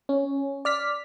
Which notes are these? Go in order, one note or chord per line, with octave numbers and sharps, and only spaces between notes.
C#4
D5 F6 B6